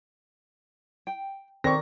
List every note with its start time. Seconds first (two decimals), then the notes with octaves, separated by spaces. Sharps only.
1.07 G5
1.64 D#3 C4 G4 A#4 D5 C#6 A#6